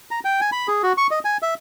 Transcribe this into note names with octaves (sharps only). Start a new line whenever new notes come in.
A#5
G5
G#5
B5
G#4
F#4
C#6
D#5
G#5
E5